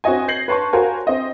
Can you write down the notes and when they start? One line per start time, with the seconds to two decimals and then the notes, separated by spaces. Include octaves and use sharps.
0.04 C4 F#4 C#5 D#5 G#5
0.28 G6 G#6 A#6 C7 F#7
0.48 B4 C#5 A5 C6 C#6
0.73 F#4 A#4 C5 C#5 F5 G#5
1.07 C4 D#5